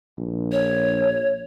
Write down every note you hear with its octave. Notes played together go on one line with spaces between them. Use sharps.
A#1
C#5